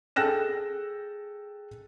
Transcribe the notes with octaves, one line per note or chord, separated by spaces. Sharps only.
G#4 A4 G5 F#6 A#6 E7